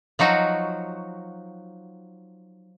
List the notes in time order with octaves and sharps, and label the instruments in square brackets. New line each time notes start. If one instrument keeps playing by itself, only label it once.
[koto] F3 F#3 D#4 F#4